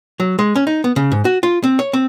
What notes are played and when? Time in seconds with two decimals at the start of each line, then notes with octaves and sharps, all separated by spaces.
0.20 F#3
0.39 G#3
0.56 C#4
0.67 D#4
0.84 B3
0.96 C#3
1.12 G#2
1.25 F#4
1.43 F4
1.64 C4
1.79 C#5
1.93 C4